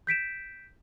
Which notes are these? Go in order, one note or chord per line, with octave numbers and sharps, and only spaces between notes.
G6 B6 D7 E7